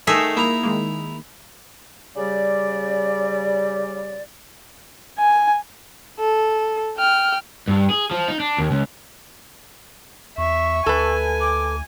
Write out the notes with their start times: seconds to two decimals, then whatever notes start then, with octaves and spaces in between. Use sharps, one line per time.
0.07 D#3 A3 D#4 G#4 E5
0.37 A#3 E4 A#5
0.63 D#3 G#3 A#3
2.17 C#3 G3 G4 D5
5.18 G#5
6.19 A4
6.98 G5 F6
7.68 G2
7.90 G#4
8.11 F3
8.28 D#4
8.40 D4
8.58 D#2
8.71 C#2
10.38 E2 E5 C#6
10.86 D2 A4 B4 G#5
11.41 D6